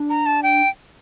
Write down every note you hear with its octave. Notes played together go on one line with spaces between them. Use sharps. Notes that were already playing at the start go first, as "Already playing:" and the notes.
Already playing: D4
A#5
A5
G5